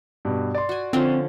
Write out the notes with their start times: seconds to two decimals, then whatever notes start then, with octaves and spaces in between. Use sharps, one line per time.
0.25 G2 B2
0.55 D5 C6
0.69 F#4 G#5
0.93 D3 F3 C4 C#4